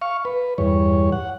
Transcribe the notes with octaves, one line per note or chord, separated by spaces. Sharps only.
F5 C#6
B4
E2 G2 C#5
F#5